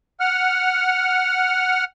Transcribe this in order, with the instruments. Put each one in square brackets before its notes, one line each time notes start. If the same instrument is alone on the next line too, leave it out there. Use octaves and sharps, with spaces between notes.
[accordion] F#5 F6